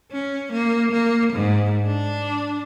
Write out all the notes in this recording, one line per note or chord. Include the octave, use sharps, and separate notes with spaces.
C#4
A#3
A#3
G#2
D4